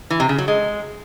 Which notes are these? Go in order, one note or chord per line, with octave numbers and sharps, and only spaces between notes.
E3
C3
C#3
F#3
G#3